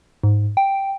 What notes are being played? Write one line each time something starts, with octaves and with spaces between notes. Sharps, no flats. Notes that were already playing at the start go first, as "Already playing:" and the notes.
G#2
G5